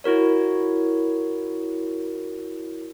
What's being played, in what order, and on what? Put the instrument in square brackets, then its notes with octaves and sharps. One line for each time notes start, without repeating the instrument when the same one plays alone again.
[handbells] E4 F#4 A#4 C#5